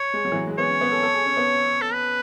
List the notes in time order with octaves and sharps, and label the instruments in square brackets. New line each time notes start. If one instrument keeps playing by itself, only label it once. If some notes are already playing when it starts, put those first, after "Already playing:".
Already playing: [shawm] C#5
[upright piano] G#3
F#3
E3
F#3
G#3
[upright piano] B3 [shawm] C#5
[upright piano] C#4
B3
A4
A4
G#4
C#4
B3
[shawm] A4
B4